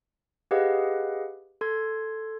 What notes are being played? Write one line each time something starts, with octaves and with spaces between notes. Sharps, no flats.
G4 G#4 B4 D#5 F5 F#5
A4 C6 G#6